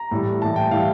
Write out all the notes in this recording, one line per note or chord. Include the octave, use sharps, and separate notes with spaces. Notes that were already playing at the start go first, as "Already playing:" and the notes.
Already playing: A#5
A2 E3 G3
A2 E3 G3 A5
G5
A2 E3 G3 F5